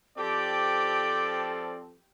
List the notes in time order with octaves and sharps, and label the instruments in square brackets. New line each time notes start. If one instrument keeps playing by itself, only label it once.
[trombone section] F3 C4 A4 [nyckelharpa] G4 G5 [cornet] D5 [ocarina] D6